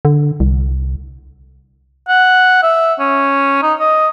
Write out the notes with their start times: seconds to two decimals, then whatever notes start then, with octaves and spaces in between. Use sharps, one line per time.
0.05 D3
0.40 C2
2.08 F#5
2.63 E5
3.00 C#4
3.63 D#4
3.80 D#5